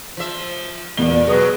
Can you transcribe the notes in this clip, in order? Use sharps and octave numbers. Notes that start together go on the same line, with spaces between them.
F3 E5
E2 A#2 G7
B2 F#3 G#4 B4 D#6